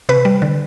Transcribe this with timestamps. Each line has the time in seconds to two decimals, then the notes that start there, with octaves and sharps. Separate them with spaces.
0.09 C3 B4
0.25 G3
0.42 D3